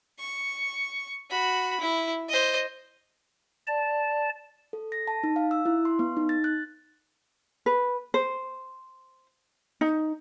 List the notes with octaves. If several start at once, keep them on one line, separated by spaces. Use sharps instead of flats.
C#6
F#4 B5
E4
C5 D#5
D5 A5
A4
A#6
A5
D#4
F5
E6
E4
C6
B3
D#4
A6
F#6
B4
C5
D#4